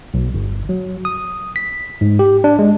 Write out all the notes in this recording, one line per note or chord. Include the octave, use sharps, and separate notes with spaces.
B1
G1
F#3
D#6
B6
G#2
G4
D4
G#3